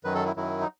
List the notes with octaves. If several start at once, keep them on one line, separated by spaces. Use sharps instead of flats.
F#2 D#3 F#3 B4
A4
E4
F#2 D#3 F#3 E4
D#4